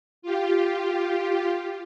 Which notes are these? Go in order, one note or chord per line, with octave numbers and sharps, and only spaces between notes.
F4 G4